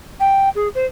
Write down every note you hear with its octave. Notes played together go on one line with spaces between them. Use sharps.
G5
G#4
C5